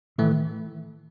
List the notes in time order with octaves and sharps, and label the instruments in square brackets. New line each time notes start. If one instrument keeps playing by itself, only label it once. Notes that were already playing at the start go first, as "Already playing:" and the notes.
[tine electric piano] A2 E3 A3 [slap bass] D#3